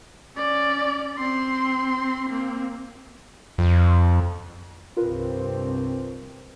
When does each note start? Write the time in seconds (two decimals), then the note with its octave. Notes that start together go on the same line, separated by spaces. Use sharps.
0.36 C#4 D5
1.18 C4 C6
2.30 A#3 C4
3.58 F2
4.97 C2 G2 C4 F4 A#4 B4